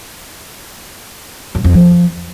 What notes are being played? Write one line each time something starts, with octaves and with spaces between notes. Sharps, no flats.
F#2
F2
F3